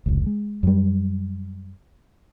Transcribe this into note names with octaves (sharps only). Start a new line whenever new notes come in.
F1 C#2
G#3
F#2 G3